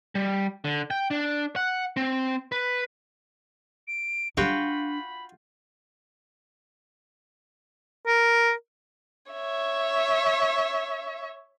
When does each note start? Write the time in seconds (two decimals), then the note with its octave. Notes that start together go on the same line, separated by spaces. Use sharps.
0.15 G3
0.65 D3
0.91 G5
1.11 D4
1.56 F#5
1.97 C4
2.52 B4
3.88 D7
4.37 D3 G3 D4 F4 F#4 G5 B5
8.07 A#4
9.32 C#5 E5